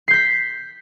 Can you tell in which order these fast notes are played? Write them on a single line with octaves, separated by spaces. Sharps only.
C7 G6 B6